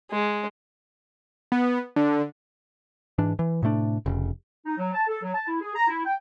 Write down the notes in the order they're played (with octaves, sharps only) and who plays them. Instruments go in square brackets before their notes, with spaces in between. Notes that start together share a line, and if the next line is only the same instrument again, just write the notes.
[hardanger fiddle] G#3
[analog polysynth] B3
D3
[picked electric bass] G#2 E3 D4
E3
A2 C3 A3 D4
F1 C#3
[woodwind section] D#4
F#3
A5
A4
F#3
A5
E4
G#4
A#5
E4
G5